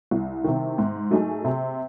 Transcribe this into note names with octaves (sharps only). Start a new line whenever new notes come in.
C2
C3 D#3
G#2
F#3 A3 D#4 G#4
C3